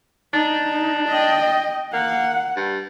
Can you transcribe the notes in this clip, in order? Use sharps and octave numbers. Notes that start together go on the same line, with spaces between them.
D4 D#4
D#5 G5
A#3 F#5
G2